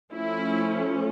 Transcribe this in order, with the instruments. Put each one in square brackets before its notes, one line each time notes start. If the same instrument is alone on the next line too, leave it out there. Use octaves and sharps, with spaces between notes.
[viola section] F3 A3 C#4 E4